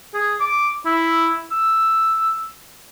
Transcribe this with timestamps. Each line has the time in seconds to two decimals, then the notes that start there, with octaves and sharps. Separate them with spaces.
0.14 G#4
0.40 D6
0.86 E4
1.52 E6